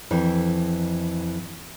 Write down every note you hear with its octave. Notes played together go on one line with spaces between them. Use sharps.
F2 E3